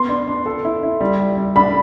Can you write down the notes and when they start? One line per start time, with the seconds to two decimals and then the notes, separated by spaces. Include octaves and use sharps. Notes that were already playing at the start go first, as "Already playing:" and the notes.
Already playing: B3 C6
0.09 D4
0.28 D4
0.46 A4
0.65 E4
0.83 E4
1.00 G3
1.20 G3
1.37 G3
1.56 D4 B5